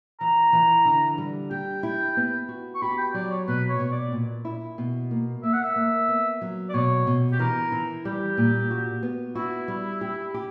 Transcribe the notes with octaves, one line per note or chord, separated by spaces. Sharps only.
E3 A#5
E3
D3
G3
G4 G5
E4
B3
F#4
C#6
G4 B5
G5
F#3 D5
C#5
B2 B4
C#5
B2
D5
A#2
E4
B2
A#3
A#3 E5
F#5
E5
A#3
B3
F#3
D5
B2 C#5
B2
G4
E3 A#4
E3
G3 G4
A#2
F#4
B3
E4 F#4
G3
G4
G4